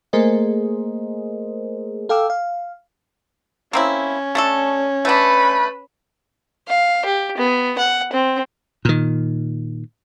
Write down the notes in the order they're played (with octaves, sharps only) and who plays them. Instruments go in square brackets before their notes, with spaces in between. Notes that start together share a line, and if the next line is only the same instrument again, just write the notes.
[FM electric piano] A3 A#3 G#4 A#4 C5 D#5
A4 F5 G5 D6 E6
F5
[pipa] A#3 C4 E4 [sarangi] C#4
[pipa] A3 D4 A4
[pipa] A3 D4 [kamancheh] B4 B5
[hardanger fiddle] F5
G4
B3
F#5
C4
[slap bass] A#2 D#3